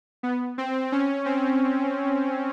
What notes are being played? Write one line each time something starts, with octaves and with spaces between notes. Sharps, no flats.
B3
C4
C#4
C4